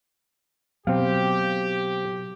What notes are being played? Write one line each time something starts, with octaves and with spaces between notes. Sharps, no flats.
B2 F#3 C4 G4 F5